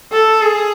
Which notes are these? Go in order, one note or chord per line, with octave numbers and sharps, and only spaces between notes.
A4
G#4